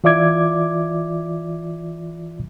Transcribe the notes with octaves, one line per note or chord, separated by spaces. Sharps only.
E3 F4 D5 E5 D6 G#6